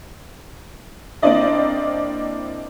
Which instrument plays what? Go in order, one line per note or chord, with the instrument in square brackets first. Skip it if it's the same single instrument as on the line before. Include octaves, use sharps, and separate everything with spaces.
[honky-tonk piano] A#3 C4 D4 E4 D5 D#5